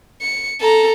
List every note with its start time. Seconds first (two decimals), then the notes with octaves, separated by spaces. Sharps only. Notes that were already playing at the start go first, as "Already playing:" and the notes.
0.22 C#7
0.61 A4 A#5